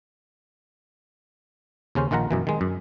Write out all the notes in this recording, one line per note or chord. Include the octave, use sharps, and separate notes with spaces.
D#2 C#3 C#4 C5
A#1 D#3 F4 F#5 A#5
F#2 B2 E3
D#3 G#3
F#2